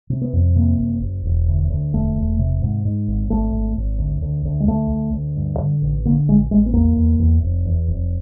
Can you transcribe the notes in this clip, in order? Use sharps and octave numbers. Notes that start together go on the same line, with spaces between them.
C3
B3
F2
C3 A#3
F#1
F#1
E1
D2
D2
E1 A3
E1
C3
G#2
G#2
G#1
G#1 A3
G#1
G#1
D2
D2
D2
G#3
D2 A3
D2
D2
G2
D3
A1
D3 A#3
A1 G#3
A1 G#3
B3
E2 A#3
E2
E2
F1
E2
F1